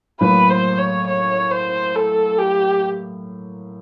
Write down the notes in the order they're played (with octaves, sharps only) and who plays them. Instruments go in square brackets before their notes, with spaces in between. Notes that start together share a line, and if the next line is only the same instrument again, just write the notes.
[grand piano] A2 F#3 A#3 [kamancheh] B4
[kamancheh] C5
C#5
C#5
C5
A4
G4